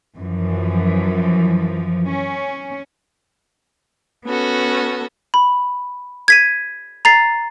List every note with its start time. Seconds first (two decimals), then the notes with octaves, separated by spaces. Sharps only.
0.16 F#2 E3 F3
2.09 C#4
4.25 B3 C#4 F#4 A4
5.34 B5
6.28 G#6 B6 D#7
7.05 A#5 A6 C7